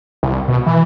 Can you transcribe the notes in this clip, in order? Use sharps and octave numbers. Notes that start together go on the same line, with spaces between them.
C2
B2
E3